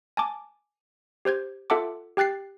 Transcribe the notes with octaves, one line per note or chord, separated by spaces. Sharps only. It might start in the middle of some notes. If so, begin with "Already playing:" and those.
G#5 A5 D6
G4 C5 G6 G#6
F4 A4 E5 F#5 A5 D6
G4 G5 F#6 A6 C7